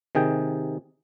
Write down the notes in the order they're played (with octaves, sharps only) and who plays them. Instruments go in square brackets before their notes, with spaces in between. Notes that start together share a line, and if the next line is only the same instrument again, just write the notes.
[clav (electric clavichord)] C3 D#3 G#4 G5